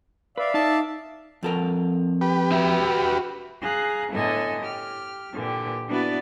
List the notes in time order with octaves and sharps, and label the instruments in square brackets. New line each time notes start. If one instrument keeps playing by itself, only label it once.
[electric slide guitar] B4 [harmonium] D5 E5 F5
[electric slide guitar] D#4 [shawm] A5
[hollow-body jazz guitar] F2 A4 A#4
[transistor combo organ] G4 B4
[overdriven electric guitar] F#4 E5
[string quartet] G#4 F5 A#5 F#6
A2 D3 B3 A4 D#5 G#5
G4 F6
A#2 D3 E3 G4
B3 D4 E4 F#4 B4 D5